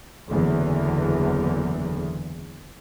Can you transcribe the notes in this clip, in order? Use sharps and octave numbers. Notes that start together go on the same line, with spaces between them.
F#1 E2 D3 E3